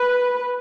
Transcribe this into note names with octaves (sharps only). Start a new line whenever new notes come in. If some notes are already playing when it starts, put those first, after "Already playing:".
Already playing: B4